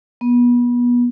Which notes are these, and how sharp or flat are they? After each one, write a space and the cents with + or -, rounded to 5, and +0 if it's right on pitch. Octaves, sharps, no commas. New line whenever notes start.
B3 -30